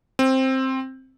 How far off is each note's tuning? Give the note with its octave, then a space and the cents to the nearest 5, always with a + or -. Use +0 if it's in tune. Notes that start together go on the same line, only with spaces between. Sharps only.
C4 +10